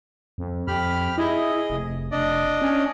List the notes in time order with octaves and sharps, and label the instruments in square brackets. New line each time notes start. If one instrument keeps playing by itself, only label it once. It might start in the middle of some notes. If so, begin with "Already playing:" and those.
[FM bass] F2
[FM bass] F2 [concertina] G4 B5 F6
[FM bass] E4 [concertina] G#4 D#5
[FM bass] F1
[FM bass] F1 [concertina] D4 D5 D#5
[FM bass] C#4